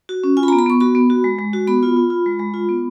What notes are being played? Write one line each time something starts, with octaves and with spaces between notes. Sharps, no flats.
F#4
C#4
F4 G#5
B5
A#5
B3
B5
B3 C#6
F#4 B5
B3
F#4
G#3
G#3
F#4
B3 B5
F4
F4
F4
G#3
G#3
F4
B3